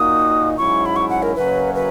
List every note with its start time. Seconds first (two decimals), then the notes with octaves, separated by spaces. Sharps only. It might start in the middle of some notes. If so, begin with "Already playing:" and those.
Already playing: A#2 A#3 D#4 F#4 D#6
0.57 G#2 F#3 C#4 E4 C#6
0.86 B5
0.96 C#6
1.09 F#5
1.23 A#4
1.36 F#2 C#3 F#3 A#3 C#4 B4
1.75 B4